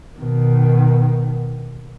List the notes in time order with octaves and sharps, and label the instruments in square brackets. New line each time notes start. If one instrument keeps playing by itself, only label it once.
[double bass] B2 D#3